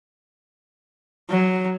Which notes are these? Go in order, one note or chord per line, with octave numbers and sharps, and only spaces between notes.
F#3